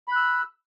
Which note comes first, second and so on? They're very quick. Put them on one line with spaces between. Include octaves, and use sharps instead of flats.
B5 F#6 E6